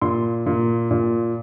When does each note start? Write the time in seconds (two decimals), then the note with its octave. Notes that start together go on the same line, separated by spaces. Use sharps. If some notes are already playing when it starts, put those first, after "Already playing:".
0.01 A#2 C6
0.46 A#2
0.91 A#2